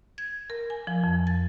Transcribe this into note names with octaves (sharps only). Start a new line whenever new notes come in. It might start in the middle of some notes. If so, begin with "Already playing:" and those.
G#6
A#4
G#5
F3
F2
A6